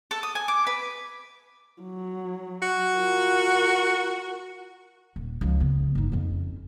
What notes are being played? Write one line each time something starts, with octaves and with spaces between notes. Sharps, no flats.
A4
D#6
G#5
D6
B4
F#3
F#4
F4 A#4
D#1
C#2 F3
C#3 B3
G1 D#4
F2 C#4